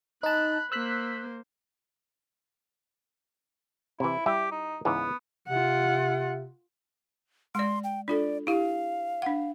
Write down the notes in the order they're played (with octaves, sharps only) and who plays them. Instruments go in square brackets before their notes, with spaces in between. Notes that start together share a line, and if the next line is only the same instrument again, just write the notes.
[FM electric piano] D#4 A5 [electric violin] B5 F#6
[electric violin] A#3 C5 [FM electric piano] E6 F#6 B6
[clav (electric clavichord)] C3 E3 [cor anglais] E4
[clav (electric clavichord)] G3 E4 E5 [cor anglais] G4
[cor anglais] D#4
[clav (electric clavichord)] C#2 G#2 E3 [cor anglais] B3
[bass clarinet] C3 [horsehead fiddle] F4 F#5
[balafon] G#3 D5 [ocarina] C6
[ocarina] G5
[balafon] D4 F4 A4 [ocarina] D5
[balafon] E4 G4 [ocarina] F5
[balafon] D4 F#5